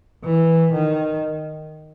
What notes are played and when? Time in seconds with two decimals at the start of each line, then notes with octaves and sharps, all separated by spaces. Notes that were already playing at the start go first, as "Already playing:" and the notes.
0.24 E3
0.73 D#3